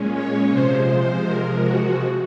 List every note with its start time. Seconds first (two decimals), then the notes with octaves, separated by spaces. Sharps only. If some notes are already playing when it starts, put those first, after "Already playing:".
Already playing: A#2 G#3 C#4
0.12 C#5
0.50 C3 F3 G#3 C5
1.24 A#4
1.62 F#4